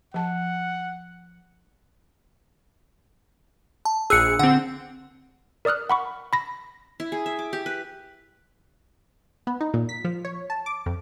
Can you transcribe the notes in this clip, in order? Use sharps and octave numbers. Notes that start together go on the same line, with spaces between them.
F3 F#5 A5
A5
A#1 G#4 E6 F#6 C#7
D3 C4 F#5
A#4 D5 D#6 F6 F#6
F#5 B5 C#6
B5 A#6
E4
G#4
E5
D6
G4
B4
B3
D#4
A#2
B6
F3
C#5
A5
D6
F2